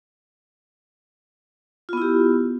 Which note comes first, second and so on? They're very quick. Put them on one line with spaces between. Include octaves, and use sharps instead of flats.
F4 B3 E4 G4